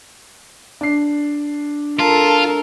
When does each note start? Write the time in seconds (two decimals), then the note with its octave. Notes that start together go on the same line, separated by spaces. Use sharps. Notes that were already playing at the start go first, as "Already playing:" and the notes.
0.81 D4 C7
1.99 F4 A4 A#4 A5